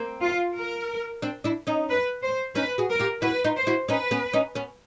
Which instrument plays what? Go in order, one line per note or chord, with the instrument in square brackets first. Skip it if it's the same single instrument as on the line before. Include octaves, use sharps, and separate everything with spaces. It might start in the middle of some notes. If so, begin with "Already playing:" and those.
Already playing: [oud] A#3 C4
[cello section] F4
A#4
[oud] C4 D4
D4 E4
C#4 D#4
[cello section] B4
C5
[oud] C#4 D#4 [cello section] B4
[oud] F#4 G#4
[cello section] A#4
[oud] F4 G4
[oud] E4 F#4 [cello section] B4
[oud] D#4 F4
[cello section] C5
[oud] E4 F#4
[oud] C#4 D#4 [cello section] B4
[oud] B3 C#4
C#4 D#4
B3 C#4